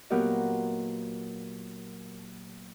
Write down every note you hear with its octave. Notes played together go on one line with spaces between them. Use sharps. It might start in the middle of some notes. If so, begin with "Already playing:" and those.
A#2 F#3 B3 G4 A#4 D#5